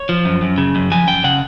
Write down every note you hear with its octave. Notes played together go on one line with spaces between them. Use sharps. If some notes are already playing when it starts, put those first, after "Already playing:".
Already playing: C#5
F3
F#2
F#2
C#3
F#2
F3 G#5
F#2 G5
C#3 F#5